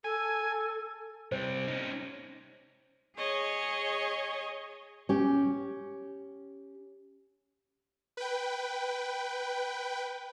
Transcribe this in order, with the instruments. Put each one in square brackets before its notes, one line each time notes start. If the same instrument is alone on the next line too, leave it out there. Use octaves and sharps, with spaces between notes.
[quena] A4 [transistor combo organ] G#5
[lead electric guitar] C3 G3 [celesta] C5
[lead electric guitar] C#4 D#4
[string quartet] G#4 C#5 D#5 G#6
[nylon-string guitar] C#4 G4
[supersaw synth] B4 G5